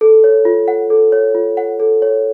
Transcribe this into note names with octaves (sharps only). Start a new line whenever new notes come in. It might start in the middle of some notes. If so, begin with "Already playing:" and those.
A4
C#5
F4
F#5
A4
C#5
F4
F#5
A4
C#5